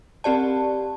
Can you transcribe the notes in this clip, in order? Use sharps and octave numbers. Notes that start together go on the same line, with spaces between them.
C4 G4 D5 A5